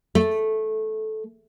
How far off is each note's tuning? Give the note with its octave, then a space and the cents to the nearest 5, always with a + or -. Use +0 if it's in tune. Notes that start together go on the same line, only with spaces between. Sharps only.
A3 -10